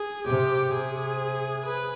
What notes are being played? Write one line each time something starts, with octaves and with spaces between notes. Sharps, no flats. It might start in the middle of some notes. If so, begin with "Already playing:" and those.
Already playing: G#4
C3 G4
C3 G#4
B4